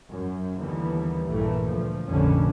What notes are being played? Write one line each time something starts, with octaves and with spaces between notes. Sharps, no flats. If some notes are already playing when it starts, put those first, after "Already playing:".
F#2
D#2 D3 E3 G3 B3
A#1 G2 A#2 E3 A3 A#3
D2 A#2 F3
F1 A#1 F2 D3 C#4